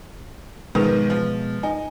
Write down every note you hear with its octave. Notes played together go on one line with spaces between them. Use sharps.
G#2 B2 D#3 F3 G#3 A#4 B4
F3
D#4 G#5